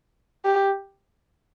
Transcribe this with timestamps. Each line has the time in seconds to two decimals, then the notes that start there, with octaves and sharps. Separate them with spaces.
0.45 G4